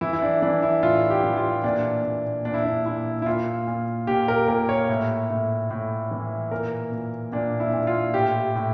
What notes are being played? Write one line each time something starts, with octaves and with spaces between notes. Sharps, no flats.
E3 E4
E4
D4
E3 D4
E4
A2 F4
G4
E3
F4
A#2 D4
A#2
A#2 D4
E4
D4
A#2 E4
E4
A#2 F4
A#2
A#2 G4
A#4
A#2 A#4
C#5
A2
A2
A2
E3
A#2 A#4
A#2
A#2 D4
E4
A#2
F4
A2 G4
A2